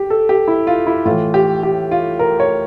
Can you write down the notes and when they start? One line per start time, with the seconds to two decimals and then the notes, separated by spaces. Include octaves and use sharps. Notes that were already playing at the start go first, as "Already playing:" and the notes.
Already playing: G4
0.10 A4
0.29 G4
0.48 E4
0.67 F4
0.87 E4
1.05 A2 E3 F4
1.34 G4
1.63 G4
1.91 F4
2.19 A#4
2.40 C#5